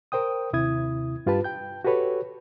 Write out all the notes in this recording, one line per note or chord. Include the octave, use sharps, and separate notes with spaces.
A#4 C5 G5 D#6
D#2 C3 E4 D#6 G#6
G2 F4 G4 B4 A5
G5 G6
F#4 G4 A4 B4 C#5